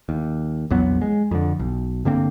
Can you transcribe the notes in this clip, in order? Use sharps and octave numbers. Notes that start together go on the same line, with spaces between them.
D#2
A#1 E2 F#3 B3
G#3
F2 D3
B1
G2 D3 A#3 C4